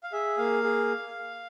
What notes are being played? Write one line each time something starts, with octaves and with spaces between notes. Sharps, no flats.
F5
G#4 E5
A#3 F5
G#4